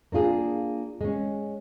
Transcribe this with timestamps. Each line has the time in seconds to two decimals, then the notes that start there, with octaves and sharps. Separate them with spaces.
0.12 A#3 D4 F4 G#4
1.01 G#3 C#4